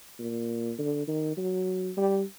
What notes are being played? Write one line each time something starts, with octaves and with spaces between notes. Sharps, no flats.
A#2
D3
D#3
F#3
G3